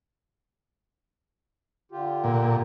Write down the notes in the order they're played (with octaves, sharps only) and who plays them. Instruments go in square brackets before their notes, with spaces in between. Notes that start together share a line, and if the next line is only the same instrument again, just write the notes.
[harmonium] D3 F4 G4
[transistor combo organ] A#2